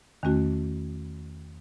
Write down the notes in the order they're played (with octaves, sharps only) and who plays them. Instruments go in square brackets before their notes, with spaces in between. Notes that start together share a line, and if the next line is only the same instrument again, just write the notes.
[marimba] E2 D#3 A3 C#4 F#4